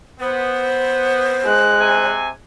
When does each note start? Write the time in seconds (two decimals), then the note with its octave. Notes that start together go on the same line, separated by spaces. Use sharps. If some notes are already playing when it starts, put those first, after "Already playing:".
0.20 B3 C5
1.45 G#3 F#6
1.80 C3 G#5